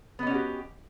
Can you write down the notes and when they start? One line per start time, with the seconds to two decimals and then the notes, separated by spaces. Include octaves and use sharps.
0.19 B3
0.23 D#5
0.27 C#4
0.30 F#4
0.34 G4